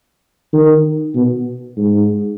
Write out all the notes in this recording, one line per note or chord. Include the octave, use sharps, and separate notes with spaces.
D#3
B2
G#2